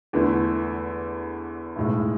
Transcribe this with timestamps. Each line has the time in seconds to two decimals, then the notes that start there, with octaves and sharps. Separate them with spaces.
0.13 E2 D3 A3 E4
1.76 B1 A2 G#3